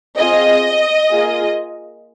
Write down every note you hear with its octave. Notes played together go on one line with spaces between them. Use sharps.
C4 F4 G#4 D#5
A#3 F4 G#4